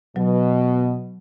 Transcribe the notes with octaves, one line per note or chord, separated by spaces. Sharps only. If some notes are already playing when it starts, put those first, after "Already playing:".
B2 F#3